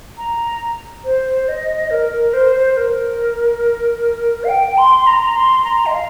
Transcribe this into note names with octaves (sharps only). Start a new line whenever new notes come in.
A#5
C5
D#5
A#4
A#4
C5
C5
A#4
F5
G5
C6
A#5
C6
A#5
D#5
F5